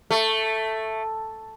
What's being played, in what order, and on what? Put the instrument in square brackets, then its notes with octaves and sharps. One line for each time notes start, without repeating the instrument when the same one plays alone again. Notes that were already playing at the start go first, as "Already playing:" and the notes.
[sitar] A3